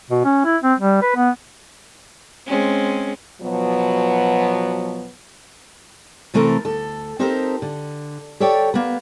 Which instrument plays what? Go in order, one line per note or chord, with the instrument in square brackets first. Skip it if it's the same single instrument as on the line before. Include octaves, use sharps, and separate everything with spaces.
[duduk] B2
C#4
E4
C4
G3
B4
B3
[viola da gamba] G#3 C4 C#4
[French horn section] B2 F3 F#3 B3
[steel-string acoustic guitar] C3 E3 A3 C4 A4 A#4
D2 A4
C4 D#4 G4 A4 A#4 C5
D3
G4 A4 C#5 D5 G5
A#3 B3